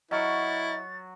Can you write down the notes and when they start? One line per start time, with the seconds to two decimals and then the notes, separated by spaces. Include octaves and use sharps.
0.11 F#3 E4 D#5 C#6 F6 A6